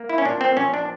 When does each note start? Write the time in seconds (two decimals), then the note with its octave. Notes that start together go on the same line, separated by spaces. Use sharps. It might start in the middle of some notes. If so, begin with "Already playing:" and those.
Already playing: A#3
0.09 E4
0.18 C#4
0.25 A#2 D4
0.41 C4
0.57 A#1 C#4
0.74 D4